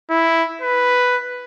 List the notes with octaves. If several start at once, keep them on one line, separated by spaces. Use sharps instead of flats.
E4
B4